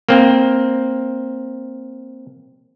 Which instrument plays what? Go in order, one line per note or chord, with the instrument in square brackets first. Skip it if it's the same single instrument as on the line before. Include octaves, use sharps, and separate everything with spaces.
[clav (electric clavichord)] A#3 C4